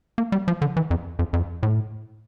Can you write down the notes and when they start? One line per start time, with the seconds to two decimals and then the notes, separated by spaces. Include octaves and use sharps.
0.18 A#3
0.32 G3
0.48 F3
0.62 D3
0.77 E3
0.91 F2
1.19 F2
1.33 F2
1.63 A2